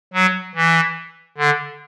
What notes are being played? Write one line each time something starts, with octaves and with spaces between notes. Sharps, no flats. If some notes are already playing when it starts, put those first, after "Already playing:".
F#3
E3
D3